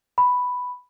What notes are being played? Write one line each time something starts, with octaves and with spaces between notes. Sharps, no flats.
B5